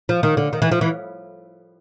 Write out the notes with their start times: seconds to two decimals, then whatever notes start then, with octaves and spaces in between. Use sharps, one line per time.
0.09 F3
0.23 D#3
0.37 D3
0.53 D#3
0.62 E3
0.72 F3
0.81 E3